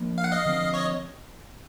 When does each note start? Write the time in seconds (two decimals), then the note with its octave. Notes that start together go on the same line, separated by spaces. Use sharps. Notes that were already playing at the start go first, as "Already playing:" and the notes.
Already playing: F3 A#3 D4
0.18 F5
0.24 F#5
0.31 D#5 F5
0.46 D3 F3 G#3 C4
0.74 C#5 D#5